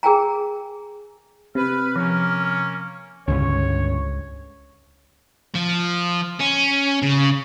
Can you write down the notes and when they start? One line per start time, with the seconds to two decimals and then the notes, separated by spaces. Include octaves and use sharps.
0.03 G#4 A#4 G5 G#5 A#5
1.55 C3 B4 F6
1.96 F3 A#3 C#4 F6
3.28 C#2 G2 D3 C#4 C#5
5.55 F3
6.40 C#4
7.02 C#3